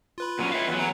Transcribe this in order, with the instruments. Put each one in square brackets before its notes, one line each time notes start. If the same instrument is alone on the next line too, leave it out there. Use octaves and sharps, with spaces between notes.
[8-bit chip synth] F4 B4 B5
[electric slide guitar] A#2 F#3 C#4
C#5 E5 F5
E2 F#3
[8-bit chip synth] B4 C#5 A#5